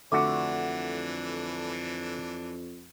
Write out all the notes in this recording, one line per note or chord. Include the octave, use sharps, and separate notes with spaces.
F2 D3 E3 A3 D4 F#4 D6